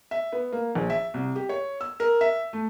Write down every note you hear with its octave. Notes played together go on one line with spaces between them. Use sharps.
E5
B3
A#3
A#1
E5
C2
G4
C#5
E6
A#4
E5
A3